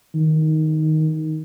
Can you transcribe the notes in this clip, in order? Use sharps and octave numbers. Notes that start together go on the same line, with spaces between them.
D#3